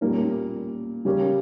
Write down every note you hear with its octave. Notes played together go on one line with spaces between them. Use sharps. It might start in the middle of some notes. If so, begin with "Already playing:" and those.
A#2 G3 A#3 C#4
C#3 G3 C#4 G4 A#4